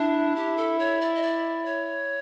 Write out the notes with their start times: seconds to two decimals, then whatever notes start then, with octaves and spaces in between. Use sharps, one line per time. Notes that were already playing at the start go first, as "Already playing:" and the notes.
Already playing: D4 E4
0.35 G4
0.57 A4
0.78 C#5
1.00 D5
1.15 D#5
1.22 D5
1.65 C#5